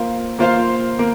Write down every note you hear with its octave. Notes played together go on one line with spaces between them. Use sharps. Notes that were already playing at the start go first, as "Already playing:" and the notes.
Already playing: A#3 F4 C5 F5
A#3 F4 C5 F5
A#3